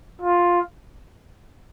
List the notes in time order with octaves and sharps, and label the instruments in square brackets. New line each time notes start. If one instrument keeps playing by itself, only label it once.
[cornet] F4